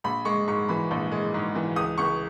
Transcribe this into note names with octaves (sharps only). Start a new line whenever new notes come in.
A#1 B5
G#3 C#6
G#2 C#6
E3 B5
A#1
G#3
G#2
E3
C#2 D#6
C#2 C#6